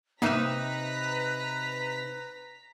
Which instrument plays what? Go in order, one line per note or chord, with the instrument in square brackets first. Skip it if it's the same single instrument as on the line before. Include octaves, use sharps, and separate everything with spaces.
[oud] C3 D#4 E5 [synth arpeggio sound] A#3 D#7 [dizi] B4 [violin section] A#5 B6